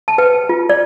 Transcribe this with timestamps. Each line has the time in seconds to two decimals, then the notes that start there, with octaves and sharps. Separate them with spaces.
0.08 A5
0.18 B4 G5
0.49 F4
0.69 D5